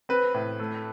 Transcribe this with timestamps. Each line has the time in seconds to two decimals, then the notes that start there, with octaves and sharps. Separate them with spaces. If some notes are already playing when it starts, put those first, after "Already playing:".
0.09 C4 B4
0.34 A2
0.60 A3